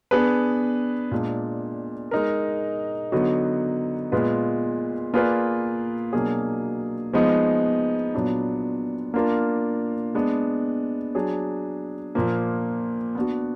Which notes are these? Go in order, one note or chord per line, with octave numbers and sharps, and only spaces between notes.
B3 D4 G#4 B4
A#2 G#3 D4
G#3 D#4 A#4
D3 F#3 B3 D#4 F#4
A#2 G#3 B3 F4 B4
A#3 F4 G#4 B4 D5
B2 F#3 A#3 D4 G#4
F3 G#3 B3 D#4
A#2 F#3 B3 D4
A#3 D4 F4 A#4
G#3 B3 D4
F#3 D4 G#4
A#2 F3 A#3
B3 D4 F#4